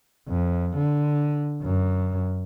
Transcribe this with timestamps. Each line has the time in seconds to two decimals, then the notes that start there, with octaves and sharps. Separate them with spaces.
0.28 F2
0.76 D3
1.64 F#2